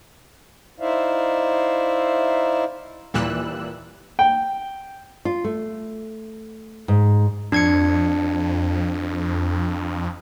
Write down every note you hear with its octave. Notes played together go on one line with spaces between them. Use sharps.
D#4 E4 C5 D5 E5 F5
D#2 A#2 E3 G3 E6 F#6
G5
F4
A3
G#2
F2 D4 G#6 C#7